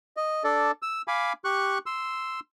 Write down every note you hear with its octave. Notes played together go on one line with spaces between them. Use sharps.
D#5
D4 A4 D5
E6
F5 G#5 B5 D6
G4 C#6 F#6
C6 E6